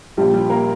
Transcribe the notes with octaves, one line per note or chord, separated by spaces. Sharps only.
A#1 A#2 F3 G3 G4
G3 G4
A#3 A#4